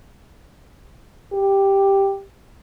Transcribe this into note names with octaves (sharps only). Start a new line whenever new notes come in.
G4